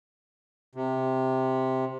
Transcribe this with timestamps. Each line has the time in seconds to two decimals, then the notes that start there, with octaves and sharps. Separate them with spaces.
0.75 C3